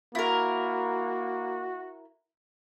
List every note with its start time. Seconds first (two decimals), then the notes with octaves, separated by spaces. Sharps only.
0.15 A#3 E4 F#4 A#4